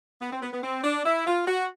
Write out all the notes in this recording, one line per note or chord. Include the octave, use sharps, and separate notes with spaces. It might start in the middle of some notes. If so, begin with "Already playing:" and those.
B3
C4
B3
B3
C4
D4
E4
F4
F#4